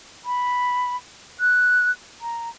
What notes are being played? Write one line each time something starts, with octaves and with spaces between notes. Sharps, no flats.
B5
F#6
A#5